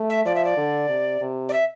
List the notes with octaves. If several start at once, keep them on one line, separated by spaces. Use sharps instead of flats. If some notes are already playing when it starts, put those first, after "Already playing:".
Already playing: A3
E5
F3 D5
E5
D5
D3
C3
C3
D5
E5